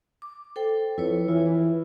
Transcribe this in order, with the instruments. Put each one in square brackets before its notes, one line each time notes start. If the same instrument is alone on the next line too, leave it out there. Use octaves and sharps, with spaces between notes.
[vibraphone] D6
A4 C5 G5
[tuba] F2 [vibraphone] E4 B4 C#5
[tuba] E3 [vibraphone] E4 F4